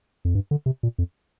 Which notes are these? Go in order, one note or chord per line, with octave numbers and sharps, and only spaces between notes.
F2
G2
D3
C3
A#2
F2